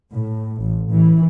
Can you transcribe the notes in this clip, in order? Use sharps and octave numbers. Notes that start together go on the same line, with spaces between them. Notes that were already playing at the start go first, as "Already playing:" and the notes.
A2
A1
E3